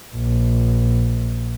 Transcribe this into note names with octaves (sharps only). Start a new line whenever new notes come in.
A#1